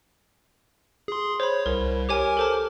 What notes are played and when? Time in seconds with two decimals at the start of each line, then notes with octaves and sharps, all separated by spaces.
1.08 G#4 C6
1.40 C5 C#5 B5
1.66 C2 A#4
2.09 G4 A#4 C#5 G#5 D6
2.37 A4 C5 A5